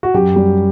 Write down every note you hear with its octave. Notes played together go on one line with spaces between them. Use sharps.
F#4
F#2 G4
G3